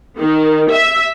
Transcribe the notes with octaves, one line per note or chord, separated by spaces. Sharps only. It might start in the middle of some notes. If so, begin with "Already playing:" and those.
D#3
E5